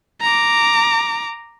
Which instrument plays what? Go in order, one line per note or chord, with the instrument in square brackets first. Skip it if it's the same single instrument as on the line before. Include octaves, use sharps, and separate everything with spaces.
[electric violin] A#5 D6